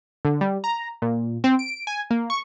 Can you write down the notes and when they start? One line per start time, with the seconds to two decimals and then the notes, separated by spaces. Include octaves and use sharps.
0.25 D3
0.41 G3
0.64 A#5
1.02 A#2
1.44 C4
1.59 D7
1.87 G#5
2.11 A#3
2.30 C#6